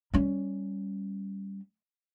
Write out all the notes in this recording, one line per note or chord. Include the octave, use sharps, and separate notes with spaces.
G3 C#4